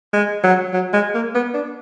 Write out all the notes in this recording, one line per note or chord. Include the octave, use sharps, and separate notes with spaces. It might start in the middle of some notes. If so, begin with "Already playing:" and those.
G#3
F#3
F#3
G#3
A#3
B3
D4